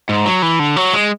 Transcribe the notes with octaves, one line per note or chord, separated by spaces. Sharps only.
G#2
F#3
E3
D3
F#3
G#3